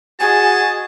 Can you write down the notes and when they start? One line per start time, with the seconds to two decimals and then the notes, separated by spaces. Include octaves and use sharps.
0.20 F#4 G#4 D#5 G#5 A5